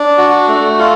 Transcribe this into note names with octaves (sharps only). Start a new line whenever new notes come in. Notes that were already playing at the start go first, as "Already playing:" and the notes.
Already playing: D4
F#4
A3
F4